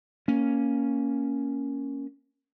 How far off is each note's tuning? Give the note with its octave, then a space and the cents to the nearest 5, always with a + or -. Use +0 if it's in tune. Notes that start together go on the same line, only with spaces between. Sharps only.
A#3 +0 C#4 +0